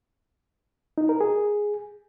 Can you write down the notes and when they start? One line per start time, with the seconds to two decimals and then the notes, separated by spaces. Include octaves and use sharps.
0.98 D#4
1.09 A#4
1.21 G#4